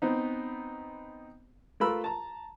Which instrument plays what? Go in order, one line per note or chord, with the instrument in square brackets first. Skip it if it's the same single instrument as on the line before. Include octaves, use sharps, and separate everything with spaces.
[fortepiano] B3 C4 D#4
A3 F4 A#4 B4 B5 E6
A5 A#5